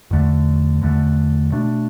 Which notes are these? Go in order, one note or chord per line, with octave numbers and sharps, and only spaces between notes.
E2 D3 A3
E2 D3 A3
B2 A3 D4